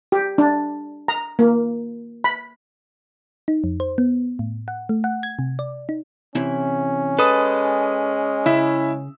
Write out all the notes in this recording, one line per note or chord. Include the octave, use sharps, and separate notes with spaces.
G4
D4
A#5
A#3
B5
D#4
F2
C5
B3
A2
F#5
A3
F#5
G#6
C3
D5
D#4
C3 E3 C#4 E4
G#3 A4 B4 D#6
C#3 E4 E5 E6